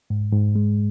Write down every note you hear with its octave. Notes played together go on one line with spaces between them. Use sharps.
G#2
G#2
G#3